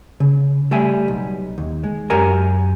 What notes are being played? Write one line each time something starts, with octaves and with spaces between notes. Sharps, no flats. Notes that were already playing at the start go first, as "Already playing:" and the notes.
C#3
G3 A3 E5 G#5
B1
D#2
G#3
F#2 G4 A#4 G#5 A#5